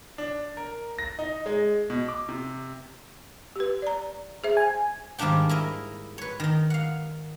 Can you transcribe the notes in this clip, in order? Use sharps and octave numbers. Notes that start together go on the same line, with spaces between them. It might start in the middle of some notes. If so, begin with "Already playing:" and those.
D4
A#4
A#6
D#4
G#3
B2
D6
C3
G4 B4
D5 A#5
G#4 C5 E5
G#5
G#2 D#3 G3 A#3 D4 G5
E4 A#4 D#5
B4 C#5
D#3 D#4
F5 F#5